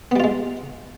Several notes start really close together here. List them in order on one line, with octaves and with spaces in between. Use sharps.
B3 G3 F4 G#3